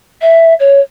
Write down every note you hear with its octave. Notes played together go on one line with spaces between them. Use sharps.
E5
C#5